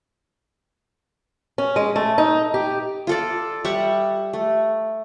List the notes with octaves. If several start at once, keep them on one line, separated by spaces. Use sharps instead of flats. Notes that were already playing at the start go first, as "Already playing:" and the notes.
C#4
G#3
A3
D#4
G4
F4 A4 D5
G3 E5 F#5 C#6
A3